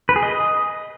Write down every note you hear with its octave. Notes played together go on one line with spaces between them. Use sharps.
B4
G#4
D#5